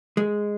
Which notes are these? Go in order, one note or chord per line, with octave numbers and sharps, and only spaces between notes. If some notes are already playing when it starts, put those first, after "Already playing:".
G#3